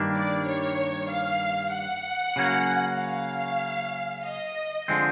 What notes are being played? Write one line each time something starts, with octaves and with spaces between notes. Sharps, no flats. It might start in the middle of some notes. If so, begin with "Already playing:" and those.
Already playing: G2 D#3 G3 A#3 D4
D5
C#5
F5
F#5
C#3 F#3 A#3 C#4 F#4
F5
D#5
D3 F3 G#3 C4